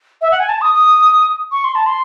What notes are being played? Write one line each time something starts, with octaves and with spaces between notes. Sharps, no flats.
E5
F#5
G#5
A5
D#6
D#6
C#6
C6
A5
C6